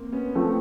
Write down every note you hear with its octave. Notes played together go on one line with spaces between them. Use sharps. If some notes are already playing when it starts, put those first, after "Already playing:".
Already playing: A#3 C4
B3 C#4
F3 A3 C4